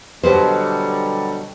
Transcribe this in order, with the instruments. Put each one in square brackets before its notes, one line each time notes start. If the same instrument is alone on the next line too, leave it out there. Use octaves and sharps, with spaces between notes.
[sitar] B2 F#3 [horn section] D3 G3 [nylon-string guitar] G4 B4 C5